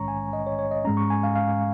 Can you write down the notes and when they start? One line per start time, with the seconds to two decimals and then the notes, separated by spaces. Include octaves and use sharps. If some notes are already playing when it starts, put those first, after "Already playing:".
Already playing: A#1 G#2 D#3 G#3 C#4 C#5 A#5 C#6
0.08 G#5
0.33 D#5
0.47 C#5
0.59 C#5
0.71 D#5
0.85 G#2 G#3 C#4 A#5
0.97 C#6
1.10 G#5
1.23 F5
1.36 F5